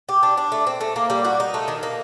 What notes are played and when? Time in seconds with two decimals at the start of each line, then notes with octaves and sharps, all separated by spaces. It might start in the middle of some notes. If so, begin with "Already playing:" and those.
0.09 G4
0.23 D4
0.37 D4
0.52 A3
0.67 C4
0.80 A3
0.96 A#3
1.10 G3
1.25 F#4
1.40 D#4
1.54 A3
1.68 D#3
1.83 A#3